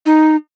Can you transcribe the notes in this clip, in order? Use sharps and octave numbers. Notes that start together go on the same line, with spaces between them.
D#4